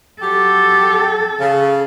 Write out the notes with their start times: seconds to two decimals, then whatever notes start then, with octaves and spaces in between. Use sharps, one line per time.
0.22 F#3 G4 A4
1.40 C#3